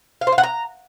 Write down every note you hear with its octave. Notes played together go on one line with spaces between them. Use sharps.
F5
C5
F5
F#5
A#5